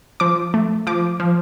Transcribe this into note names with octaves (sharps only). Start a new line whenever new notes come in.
F3 D6
A3
F3 D6
F3